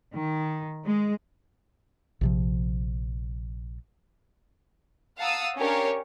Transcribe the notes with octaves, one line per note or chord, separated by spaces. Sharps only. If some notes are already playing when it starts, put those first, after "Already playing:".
D#3
G#3
A#1 C3 F3
F5 F#5 A5 A#5 D#6 E6
C#4 D4 G4 A#4 C#5 F5